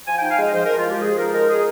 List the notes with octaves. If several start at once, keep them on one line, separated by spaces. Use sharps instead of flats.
F3 G#5
D#4 G5
F5
G#3 D#5
F3 C5
F3 A#4
F4
G#3 G4
F3 G#4
D#4 A#4
G#3 A#4
D#4 G#4